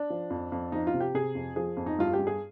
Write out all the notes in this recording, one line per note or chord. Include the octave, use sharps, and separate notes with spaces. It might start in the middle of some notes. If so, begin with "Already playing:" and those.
Already playing: D4
F3
F2
F2
F3 D#4
F4
C3
G4
C3 G#4
F2
F3 G#4
F2
D#4
G2 F4
G4
G2
G#4